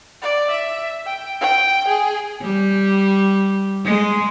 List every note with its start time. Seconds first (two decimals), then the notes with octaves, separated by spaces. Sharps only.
0.22 D5
0.50 E5
1.06 G5
1.41 G5
1.88 G#4
2.42 G3
3.85 G#3